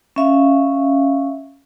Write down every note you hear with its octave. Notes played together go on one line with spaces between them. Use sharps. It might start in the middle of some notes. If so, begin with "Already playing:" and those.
C#4 E5 F5